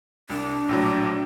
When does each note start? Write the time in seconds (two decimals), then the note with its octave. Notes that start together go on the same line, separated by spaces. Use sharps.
0.30 C2 D4
0.69 A#1 A2 F#3